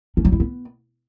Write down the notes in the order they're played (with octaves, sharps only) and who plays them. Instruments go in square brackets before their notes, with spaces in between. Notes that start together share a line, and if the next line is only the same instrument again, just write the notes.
[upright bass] C#4
F#3
E4
B3